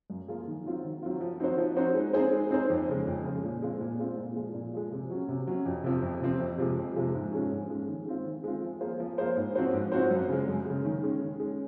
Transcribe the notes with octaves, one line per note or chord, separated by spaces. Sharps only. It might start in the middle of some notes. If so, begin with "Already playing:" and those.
F#2
F3 A#3 F4 G#4
D#3
F#3 C4 F4
D#3
F#3 C4 F4
F3
C4 D#4 F#4 C5
F3
C4 D#4 F#4 C5
G#3
C4 D#4 G#4 C5
G#3
C4 D#4 G#4 C5
F2
C#3 G#3
F2
C#3 G#3
A#2
G#3 C4 F4
A#2
G#3 C4 F4
A#2
F3 G#3
A#2
F3 G#3
C3
F#3 C#4
C3
F#3 C#4
F2
C3 F3 C4
F2
C3 F3 C4
F2
C3 F3 G#3
F2
C3 F3 G#3
G#2
F3 G#3 C#4
G#2
F3 G#3 C#4
D#3
G#3 C4 F4
D#3
G#3 C4 F4
F3
A#3 F4 G#4 C5
F3
A#3 F4 G#4 C5
G#2
F3 C4 F#4 C5
G#2
F3 C4 F#4 C5
F#2
C#3 G#3
F#2
C#3 G#3
D#3
G#3 C#4
D#3
G#3 C#4